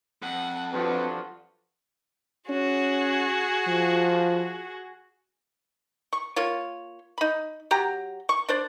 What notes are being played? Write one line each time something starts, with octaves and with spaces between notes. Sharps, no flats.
F2 F#5
G2 D3 F3 F#4 B4
C#4 F#4 G#4
F3
C#6
A#3 F4 C#5
D#4 B5
F#3 G4 A#5
C#6
D4 C5 D5